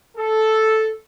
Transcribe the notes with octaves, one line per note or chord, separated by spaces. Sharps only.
A4